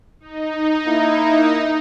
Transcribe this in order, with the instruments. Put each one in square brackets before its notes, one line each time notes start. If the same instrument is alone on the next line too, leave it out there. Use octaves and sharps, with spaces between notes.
[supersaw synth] D#4
[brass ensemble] A#3 E4